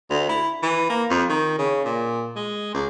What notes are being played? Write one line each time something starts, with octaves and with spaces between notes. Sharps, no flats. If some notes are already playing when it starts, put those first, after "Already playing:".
D2
E4
E3
A#3
F2
D#3
C#3
A#2
G#3
C#2